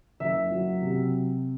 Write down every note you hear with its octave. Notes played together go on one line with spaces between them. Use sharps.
F#1 E5
F#3
C3